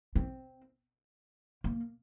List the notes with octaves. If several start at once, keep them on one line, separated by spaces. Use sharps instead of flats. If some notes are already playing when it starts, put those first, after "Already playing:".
C4
A#3